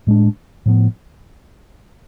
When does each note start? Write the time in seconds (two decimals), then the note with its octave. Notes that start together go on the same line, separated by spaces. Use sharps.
0.07 A2 G#3 D4
0.66 A2 F3 B3